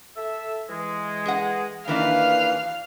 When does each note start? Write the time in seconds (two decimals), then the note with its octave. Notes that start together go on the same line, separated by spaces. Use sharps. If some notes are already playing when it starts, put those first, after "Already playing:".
0.16 A4 E5
0.69 E3 G#3
1.26 G#4 F#5
1.88 D#3 E3 A#3 D4 B4 F5